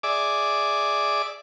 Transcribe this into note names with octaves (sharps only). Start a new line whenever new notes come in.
G#4 D5 E5 D6